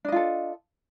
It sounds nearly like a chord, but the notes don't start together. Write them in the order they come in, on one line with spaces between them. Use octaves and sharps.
D4 D#5 F4 A4